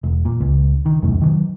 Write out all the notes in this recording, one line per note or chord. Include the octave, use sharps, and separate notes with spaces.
E1
A#2
C#2
D#3
E1 C2 F#2 A2
D#3 E3 F#3